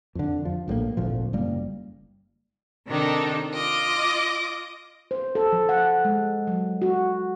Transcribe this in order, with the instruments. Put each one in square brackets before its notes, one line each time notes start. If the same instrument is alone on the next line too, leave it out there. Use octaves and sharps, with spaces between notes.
[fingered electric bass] F2 D3
F3
A#1 A2 F3 A#3
G#1 D2 A#2 F3
F#1 G3 A#3
[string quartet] C3 D#3 D4 D#4 A4
F4 D#5 D6
[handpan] C5
A4
F3
F#5
G#3
F#3
F#4